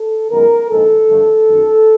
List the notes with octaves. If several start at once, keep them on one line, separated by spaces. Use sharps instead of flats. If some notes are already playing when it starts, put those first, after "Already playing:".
Already playing: A4
F#2 D#3 G#3 B3 A#4
A#1 G#2 F3 G#3 A4
G2 D3 F3 A3
F#2 D#3 F#3